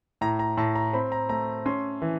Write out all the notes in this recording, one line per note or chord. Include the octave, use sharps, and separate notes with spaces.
A2 A#5
A#5
A2 A5
A#5
C4 B5
A#5
A3 A#5
C#4 C6
E3